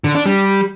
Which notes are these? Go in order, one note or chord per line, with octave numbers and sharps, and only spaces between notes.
D3
D4
G3